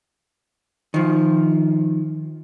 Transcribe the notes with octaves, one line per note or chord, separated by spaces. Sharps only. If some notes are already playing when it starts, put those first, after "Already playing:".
D#3 F3